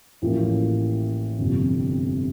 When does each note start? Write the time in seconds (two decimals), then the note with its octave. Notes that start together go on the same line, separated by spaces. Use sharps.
0.22 A1 A2 F3 A#3 E4
1.38 G1 F2 C3